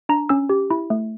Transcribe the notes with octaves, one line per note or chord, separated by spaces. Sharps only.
D4 A#5
C#4 E6
G4
E4
A3